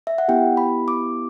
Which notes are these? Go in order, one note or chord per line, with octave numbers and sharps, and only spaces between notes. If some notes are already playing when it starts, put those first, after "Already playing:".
E5
F#5
B3 E4 G4 G5
B5
D6